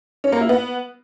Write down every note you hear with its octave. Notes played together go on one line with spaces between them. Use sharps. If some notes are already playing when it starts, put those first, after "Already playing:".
C#4
A#3
E4
B3